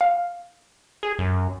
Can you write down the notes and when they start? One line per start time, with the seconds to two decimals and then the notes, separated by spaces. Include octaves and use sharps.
0.01 F5
1.03 G#4
1.19 F#2